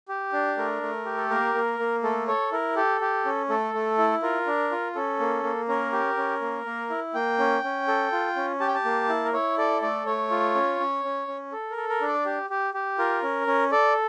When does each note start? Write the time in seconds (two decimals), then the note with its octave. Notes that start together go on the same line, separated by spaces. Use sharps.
0.09 G4
0.33 D4
0.57 A3 A#4
0.82 A3
1.06 G4
1.17 A4
1.30 A#3 A#4
1.54 A#3
1.79 A#3
2.03 A3 A4
2.28 A4 C#5
2.52 E4 A#4
2.76 G4 A4
3.01 G4
3.25 C#4
3.49 A3 A4
3.74 A3
3.98 E4
4.22 F4 A#4
4.47 D4
4.72 F4
4.95 C#4 A4
5.20 A#3
5.44 A#3
5.68 C#4 A#4
5.93 G4
6.17 C#4
6.41 A#3
6.66 A#3
6.90 E4
7.14 A#3 G5
7.39 C#4
7.64 C#4
7.88 A4
8.12 F4
8.36 C#4
8.60 G4 A5
8.68 G5
8.74 A5
8.85 A#3
9.09 E4
9.25 A#4
9.33 E4 C#5
9.58 A4 D5
9.82 A3 D5
10.06 A3 C#5
10.31 F4
10.55 C#4
10.80 C#4
11.04 C#4
11.28 C#4
11.52 A4
11.71 A#4
11.77 A4
11.89 A#4
12.01 D4
12.07 D5
12.25 G4
12.50 G4
12.74 G4
12.98 F4 A#4
13.23 C#4
13.47 C#4
13.71 A4 D5